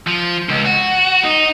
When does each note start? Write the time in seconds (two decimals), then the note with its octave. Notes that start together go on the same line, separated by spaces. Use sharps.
0.07 F3
0.49 C#2
0.66 F#4
1.23 D#4